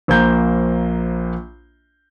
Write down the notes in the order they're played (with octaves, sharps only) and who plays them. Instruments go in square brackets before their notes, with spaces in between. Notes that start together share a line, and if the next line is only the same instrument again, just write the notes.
[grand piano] A#1 A#3 C5 A#5 G6